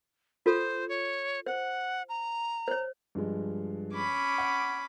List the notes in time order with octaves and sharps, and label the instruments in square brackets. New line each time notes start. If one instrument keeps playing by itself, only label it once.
[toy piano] F4 A4 [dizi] C5
[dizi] C#5
[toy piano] C5 [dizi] F#5
[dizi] A#5
[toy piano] C5 C#5
[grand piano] G2 F3 G#3
[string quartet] C#4 B5 D6
[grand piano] F#5